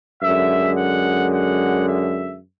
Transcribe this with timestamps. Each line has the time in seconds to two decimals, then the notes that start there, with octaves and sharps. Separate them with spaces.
0.22 F#2 D3 G#3 E5
0.76 F#5
1.31 F#5
1.85 E5